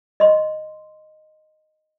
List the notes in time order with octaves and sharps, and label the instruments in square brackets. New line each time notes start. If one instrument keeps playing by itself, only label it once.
[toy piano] D#5 C6